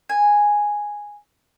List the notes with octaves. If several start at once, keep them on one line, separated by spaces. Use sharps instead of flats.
G#5